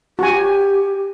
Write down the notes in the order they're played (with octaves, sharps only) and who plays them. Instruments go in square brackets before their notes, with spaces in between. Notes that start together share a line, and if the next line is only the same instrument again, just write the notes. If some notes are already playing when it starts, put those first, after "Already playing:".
[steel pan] F#4 G#5 [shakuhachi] G4